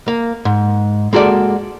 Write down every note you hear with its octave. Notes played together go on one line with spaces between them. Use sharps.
A#3
G#2
G#3 A#3 F#4 A4 D5